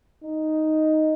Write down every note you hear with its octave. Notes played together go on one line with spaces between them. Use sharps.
D#4